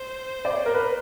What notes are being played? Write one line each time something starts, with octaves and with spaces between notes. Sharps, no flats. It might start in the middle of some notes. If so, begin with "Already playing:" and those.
Already playing: C5
D5
C#5
A#4
B4